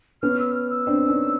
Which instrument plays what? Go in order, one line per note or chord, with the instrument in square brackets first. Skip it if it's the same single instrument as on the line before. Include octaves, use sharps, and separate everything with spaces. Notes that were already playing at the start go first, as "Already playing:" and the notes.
[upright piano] B3 C#4 [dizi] F6
[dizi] E6
F6
E6
[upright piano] C4 D4
C#4 D#4